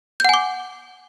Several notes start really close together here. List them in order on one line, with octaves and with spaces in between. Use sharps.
G6 F#5 G#5 D6